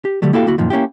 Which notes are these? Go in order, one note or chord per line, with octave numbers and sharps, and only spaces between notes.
G4
D3 F#3 G3 A3
A#3 E4 F#4 G4 A4 F5
D2 A#3 E4 F#4
F#2 A#2 D#3 F3
A#3 C#4 E4 G4